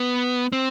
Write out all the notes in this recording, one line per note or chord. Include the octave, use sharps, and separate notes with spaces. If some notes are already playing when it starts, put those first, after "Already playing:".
Already playing: B3
C4